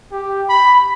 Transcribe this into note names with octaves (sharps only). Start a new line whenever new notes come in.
G4
B5